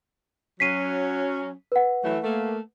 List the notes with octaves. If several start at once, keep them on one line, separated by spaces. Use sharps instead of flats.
F#3 C#4 B6 C7 D#7
B4 F#5
E3 F#3 A3
A3 A#3